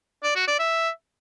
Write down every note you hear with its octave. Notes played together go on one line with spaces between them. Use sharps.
D5
F#4
D5
E5